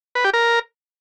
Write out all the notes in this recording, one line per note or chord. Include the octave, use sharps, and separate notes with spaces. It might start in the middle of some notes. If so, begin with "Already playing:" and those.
B4
G4
A#4